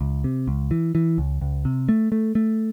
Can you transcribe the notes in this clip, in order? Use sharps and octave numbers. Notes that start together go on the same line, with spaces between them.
C#2
C3
C#2
E3
E3
C#2
C#2
C3
A3
A3
A3